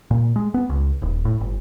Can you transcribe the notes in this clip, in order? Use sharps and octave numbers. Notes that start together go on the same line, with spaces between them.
A#2
G#3
B3
C#2
D#1
A2
G1